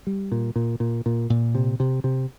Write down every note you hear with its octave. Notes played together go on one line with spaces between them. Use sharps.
G3
A#2
A#2
A#2
A#2
A#2
C3
C3
C3